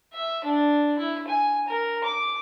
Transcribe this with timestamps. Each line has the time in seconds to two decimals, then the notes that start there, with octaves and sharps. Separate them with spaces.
0.13 E5
0.44 D4
0.99 E4
1.28 G#5
1.68 A#4
2.04 D6